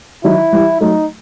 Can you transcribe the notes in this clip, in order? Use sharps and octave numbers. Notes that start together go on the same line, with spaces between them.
D#3 F#3 E4
E3 G3
F#3 A3 D#4